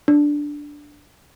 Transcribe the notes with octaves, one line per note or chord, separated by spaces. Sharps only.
D4